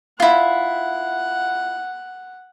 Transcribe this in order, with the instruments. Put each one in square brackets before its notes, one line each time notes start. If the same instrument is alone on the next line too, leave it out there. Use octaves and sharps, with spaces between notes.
[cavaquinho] E4 F4 [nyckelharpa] F#5